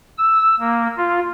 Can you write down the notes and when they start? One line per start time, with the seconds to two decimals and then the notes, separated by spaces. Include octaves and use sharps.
0.18 E6
0.60 A#3
0.98 F4